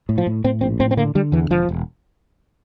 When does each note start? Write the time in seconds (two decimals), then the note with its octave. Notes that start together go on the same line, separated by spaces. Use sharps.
0.09 A2
0.18 F3
0.27 A2
0.44 A2 C4
0.61 A#1 C4
0.80 A2 C4
0.91 C4
0.97 D3 A#3
1.15 D3 G3
1.32 E2 E3
1.50 E1 F3
1.69 E1